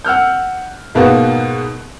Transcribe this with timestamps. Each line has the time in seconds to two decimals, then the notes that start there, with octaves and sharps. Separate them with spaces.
0.05 F#5 E6 F6 G6
0.95 G#2 B2 A#3 B3 F#4